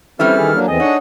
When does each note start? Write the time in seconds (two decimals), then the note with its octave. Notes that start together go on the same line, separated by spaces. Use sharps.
0.20 E3 G3 C4 C#4 E4 A4 F6
0.38 D#3 G#4
0.53 F#3 A#3 D4
0.68 E2 E3 C4 G#4 A4 D#5
0.80 D4 D#4 C#5 F#5